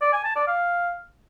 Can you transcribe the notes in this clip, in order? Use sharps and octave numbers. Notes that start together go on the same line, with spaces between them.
D5
G#5
A5
D5
F5